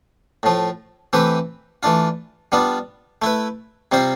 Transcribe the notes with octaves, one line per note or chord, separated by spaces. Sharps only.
A2 F3 A3
E3 A3 C4 G4 B4
E3 A3 D4 F4
G3 B3 D4 F4
A3 E4 B4
C3 G3 C4 F4 C5